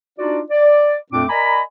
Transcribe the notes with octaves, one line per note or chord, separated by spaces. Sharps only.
D4 D#4 F4 F#4 D5
D5
F2 A#2 A3 C4 D4 D6
A#4 D5 D#5 G#5 A#5 B5